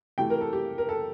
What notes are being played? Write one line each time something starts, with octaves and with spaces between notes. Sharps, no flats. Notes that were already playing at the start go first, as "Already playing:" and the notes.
C3 E3 A3 G5
A#4
A4
G4
A#4
A4